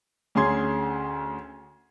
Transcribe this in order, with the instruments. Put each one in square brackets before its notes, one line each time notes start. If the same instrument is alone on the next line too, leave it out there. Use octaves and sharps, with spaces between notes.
[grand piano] D2 C#4 G#4 C6 G#6